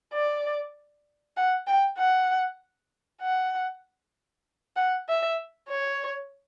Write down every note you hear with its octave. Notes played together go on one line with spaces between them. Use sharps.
D5
F#5
G5
F#5
F#5
F#5
E5
C#5